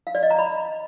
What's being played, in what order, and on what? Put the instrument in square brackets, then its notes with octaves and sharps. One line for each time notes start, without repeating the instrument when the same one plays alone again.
[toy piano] F5
D5
D#5
A#5
B5